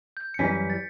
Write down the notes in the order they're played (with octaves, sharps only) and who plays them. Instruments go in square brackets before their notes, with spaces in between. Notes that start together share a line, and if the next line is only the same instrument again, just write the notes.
[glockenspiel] G6
C#7
[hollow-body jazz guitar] F#2 E3 G3 C#4 [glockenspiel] B6
[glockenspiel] A6